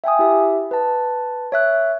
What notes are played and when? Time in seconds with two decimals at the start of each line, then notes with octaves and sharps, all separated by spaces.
0.04 E5 G5 G#5 D#6
0.19 E4 G4 E5
0.71 B4 A5
1.52 C#5 E5 F#6